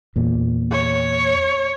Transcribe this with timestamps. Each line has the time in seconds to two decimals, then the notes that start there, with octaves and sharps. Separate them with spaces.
0.16 E2 A#2
0.72 C#5